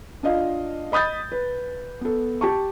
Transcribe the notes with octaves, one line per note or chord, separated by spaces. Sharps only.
D4 F4 D#5 F5
D#5 B5 D#6 G6 A6
B4
B3 A4
G4 A5 C#6